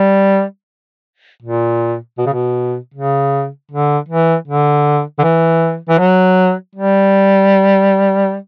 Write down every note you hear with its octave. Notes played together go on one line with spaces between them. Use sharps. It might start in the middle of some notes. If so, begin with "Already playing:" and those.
Already playing: G3
A#2
B2
C#3
B2
C#3
D3
E3
D3
D3
E3
E3
F#3
G3